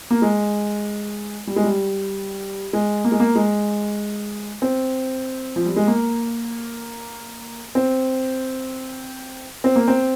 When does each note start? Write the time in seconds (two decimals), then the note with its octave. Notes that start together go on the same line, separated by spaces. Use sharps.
0.11 A#3
0.22 G#3
1.47 G3
1.56 G#3
1.64 G3
2.73 G#3
3.05 A#3
3.12 G#3
3.20 A#3
3.36 G#3
4.62 C4
5.56 F3
5.66 G3
5.76 G#3
5.88 A#3
7.75 C4
9.64 C4
9.76 A#3
9.88 C4